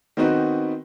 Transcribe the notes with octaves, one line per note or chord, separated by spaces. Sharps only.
D#3 B3 C4 D#4 F#4 B4